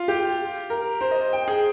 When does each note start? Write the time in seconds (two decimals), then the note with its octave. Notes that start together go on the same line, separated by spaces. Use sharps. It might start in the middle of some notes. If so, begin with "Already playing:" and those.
Already playing: F4
0.08 G4
0.70 A#4
1.01 C5
1.11 D#5
1.33 G5
1.48 G#4